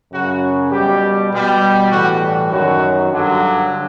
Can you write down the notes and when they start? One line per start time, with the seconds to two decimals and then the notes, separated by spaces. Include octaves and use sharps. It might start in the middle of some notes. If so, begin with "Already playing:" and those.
0.12 F#2 C#3 F#3 F#4
0.71 B2 G3 G4
1.32 B2 G3
1.90 A2 E3 G3 F#4
2.50 F#2 D#3 F#3 F#4
3.09 G2 D3 F#3